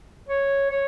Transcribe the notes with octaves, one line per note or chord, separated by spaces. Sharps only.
C#5
C#5